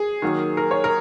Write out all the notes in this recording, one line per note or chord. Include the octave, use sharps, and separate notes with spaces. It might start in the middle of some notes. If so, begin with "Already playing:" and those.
Already playing: G#4
D#3 F#3 A#3
A#4
C#5
A#4